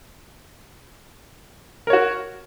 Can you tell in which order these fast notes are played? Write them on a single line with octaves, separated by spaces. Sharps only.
A#4 C#5 F#4